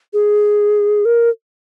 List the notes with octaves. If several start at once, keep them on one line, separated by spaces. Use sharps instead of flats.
G#4
A#4